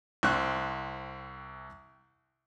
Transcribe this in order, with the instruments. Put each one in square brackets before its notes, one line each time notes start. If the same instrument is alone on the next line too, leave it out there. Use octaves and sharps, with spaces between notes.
[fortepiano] C2 C4 C#6 F#6